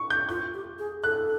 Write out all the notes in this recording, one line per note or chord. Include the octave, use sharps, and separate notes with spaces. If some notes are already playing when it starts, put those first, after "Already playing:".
Already playing: C#6
G6
F4 G6
G4
G#4
A4 F#6